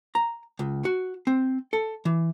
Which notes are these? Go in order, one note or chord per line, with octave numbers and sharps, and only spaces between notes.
A#5
C#2
F#4
C4
A4
E3